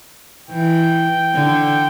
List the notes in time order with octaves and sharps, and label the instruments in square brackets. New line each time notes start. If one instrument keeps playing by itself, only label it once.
[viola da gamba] E3 [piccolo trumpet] G5
[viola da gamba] D3